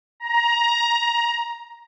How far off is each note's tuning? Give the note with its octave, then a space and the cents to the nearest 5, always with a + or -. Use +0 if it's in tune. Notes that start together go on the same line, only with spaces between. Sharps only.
A#5 +15